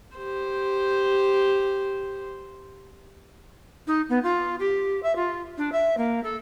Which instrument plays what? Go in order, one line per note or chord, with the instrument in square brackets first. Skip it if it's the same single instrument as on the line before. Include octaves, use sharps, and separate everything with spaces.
[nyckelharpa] G4 C5
[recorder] D#4
B3
F4
G4
E5
F4
D4
E5
A#3
A4